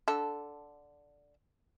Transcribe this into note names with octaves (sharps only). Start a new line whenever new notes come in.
D3 A4